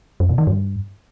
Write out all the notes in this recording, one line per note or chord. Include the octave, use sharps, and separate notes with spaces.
F#2
B2
D#3
G2